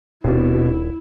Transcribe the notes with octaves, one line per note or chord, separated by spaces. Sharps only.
D#1 B2 C4 D4 E4 G4